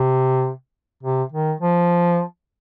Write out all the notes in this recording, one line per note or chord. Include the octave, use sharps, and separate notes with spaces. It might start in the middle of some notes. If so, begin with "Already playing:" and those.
Already playing: C3
C3
D#3
F3